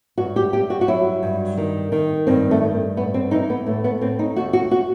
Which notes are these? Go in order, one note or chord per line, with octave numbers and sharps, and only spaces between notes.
G2 F#4
G4
G2 G4
F#4
F#4
F#3 E4
G2
D#3
D#3
G2 C4
A3
G2
A2 B3
C4
E3 D#4
B3
A2 A3
B3
A2 C4
D#4
D#2 F#4
F#4
F#4